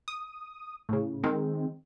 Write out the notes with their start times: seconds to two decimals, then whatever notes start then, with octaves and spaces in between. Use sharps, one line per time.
0.08 D#6
0.89 A2 C#3
1.23 D#3 G#3 C4